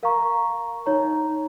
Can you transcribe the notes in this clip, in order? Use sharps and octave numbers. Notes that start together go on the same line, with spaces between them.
A#4 F5 A#5 C#6
D#4 C#5 A#5